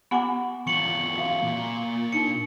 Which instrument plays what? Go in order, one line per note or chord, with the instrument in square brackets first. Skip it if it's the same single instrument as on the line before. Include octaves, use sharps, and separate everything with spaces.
[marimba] B3 F#5 G#5 [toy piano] G4 A#5 D6
[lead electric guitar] E2 F4 [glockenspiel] C#6 C#7 F#7
[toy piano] F#4 E5 F5
[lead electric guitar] A#2
[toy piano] D4 D#4 A#4 [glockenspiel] C#7